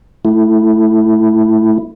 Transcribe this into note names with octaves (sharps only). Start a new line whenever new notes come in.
A3 E4